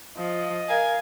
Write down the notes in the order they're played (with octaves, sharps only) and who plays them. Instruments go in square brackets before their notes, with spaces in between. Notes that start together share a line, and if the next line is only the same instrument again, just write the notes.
[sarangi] F3 [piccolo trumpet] D#5
[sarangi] A#4 [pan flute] F5 [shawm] G#5